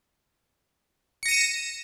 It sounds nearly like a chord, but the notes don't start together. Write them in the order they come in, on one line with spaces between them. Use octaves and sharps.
C#7 A#6 D#7 E7